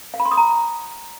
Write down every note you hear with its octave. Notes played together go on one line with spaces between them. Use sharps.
F5
B5
C6
D#6
A#5